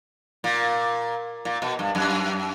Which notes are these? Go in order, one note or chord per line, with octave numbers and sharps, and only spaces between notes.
A#2
A#2
B2
G2
F#2